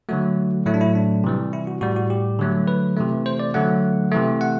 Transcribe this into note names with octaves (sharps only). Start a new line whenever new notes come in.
D3 F#3 A3 F#4
A2 F#3 A3 E4
D4
E4
D4
C3 E3 G3
E4
F#4
A2 G3 F#4
F#4
G4
D3 F#3 A3
B4
C3 E3 A3
C5
D5
D3 F#3 A3 F#5
C3 E3 A3
F#5